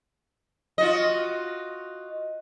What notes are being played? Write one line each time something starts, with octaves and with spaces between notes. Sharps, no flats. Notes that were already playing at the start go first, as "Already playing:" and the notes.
F4 F#4 D#5